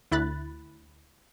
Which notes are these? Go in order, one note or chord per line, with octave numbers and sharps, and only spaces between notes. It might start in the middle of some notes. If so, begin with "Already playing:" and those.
D2 E4 B5 F#6 A6